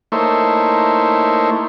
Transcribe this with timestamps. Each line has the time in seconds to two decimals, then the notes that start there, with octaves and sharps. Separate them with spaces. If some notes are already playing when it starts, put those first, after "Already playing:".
0.12 A3 A#3 D#4 E4 C5 C#5